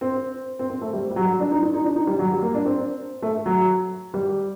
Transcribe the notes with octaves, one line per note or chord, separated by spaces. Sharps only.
C4
C4
C4
A3
G3
G3
F#3
D4
D#4
D#4
D#4
D4
D#4
G3
F#3
G3
A#3
D4
C4
A3
F#3
G3